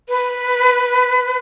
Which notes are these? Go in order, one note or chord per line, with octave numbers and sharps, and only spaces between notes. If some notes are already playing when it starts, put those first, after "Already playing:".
B4